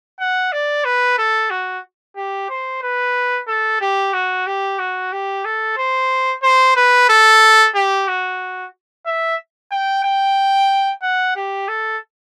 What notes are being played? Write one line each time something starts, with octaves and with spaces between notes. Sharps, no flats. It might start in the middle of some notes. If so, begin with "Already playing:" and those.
F#5
D5
B4
A4
F#4
G4
C5
B4
A4
G4
F#4
G4
F#4
G4
A4
C5
C5
B4
A4
G4
F#4
E5
G5
G5
F#5
G4
A4